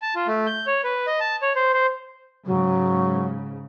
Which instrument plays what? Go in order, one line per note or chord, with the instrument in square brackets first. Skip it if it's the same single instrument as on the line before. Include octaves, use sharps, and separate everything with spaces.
[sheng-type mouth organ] A5
F4
A3
G6
C#5
B4
D#5
A5
C#5
C5
C5
[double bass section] G#2 C#3 [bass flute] F#3